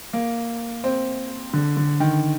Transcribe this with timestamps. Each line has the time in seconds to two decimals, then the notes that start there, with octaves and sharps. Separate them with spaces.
0.13 A#3
0.84 C4
1.53 D3
1.77 D3
2.00 D#3